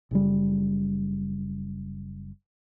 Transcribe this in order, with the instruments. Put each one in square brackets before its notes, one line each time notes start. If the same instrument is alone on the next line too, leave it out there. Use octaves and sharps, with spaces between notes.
[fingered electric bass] F#1 C#3 G3